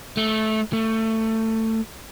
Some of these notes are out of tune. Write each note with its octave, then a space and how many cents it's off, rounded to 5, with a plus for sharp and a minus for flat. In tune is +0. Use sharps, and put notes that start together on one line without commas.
A3 -15
A3 +20